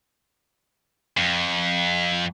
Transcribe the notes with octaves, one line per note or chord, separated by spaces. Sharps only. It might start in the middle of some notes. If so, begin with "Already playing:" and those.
F2